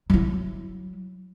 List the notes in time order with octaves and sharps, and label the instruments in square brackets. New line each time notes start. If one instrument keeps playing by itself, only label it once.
[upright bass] F#3 E4